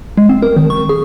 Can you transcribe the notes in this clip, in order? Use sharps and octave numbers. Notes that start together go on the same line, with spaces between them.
G#3
C4
A#4
D#3
C#6
G#4